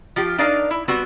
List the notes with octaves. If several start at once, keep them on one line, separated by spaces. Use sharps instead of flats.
F3 F4 G4
D4 D#4 A#4 D5 F5
E4
G3 B3 C4 F#4